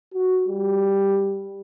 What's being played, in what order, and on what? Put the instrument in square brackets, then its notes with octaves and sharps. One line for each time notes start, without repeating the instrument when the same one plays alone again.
[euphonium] F#4
G3